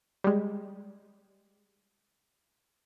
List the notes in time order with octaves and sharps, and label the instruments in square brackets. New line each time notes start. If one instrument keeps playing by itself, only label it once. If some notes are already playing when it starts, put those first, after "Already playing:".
[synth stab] G3 G#3